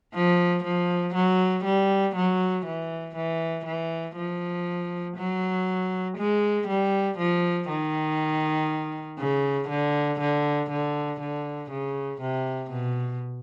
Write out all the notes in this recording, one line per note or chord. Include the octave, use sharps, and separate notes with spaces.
F3
F3
F#3
G3
F#3
E3
E3
E3
F3
F#3
G#3
G3
F3
D#3
C#3
D3
D3
D3
D3
C#3
C3
B2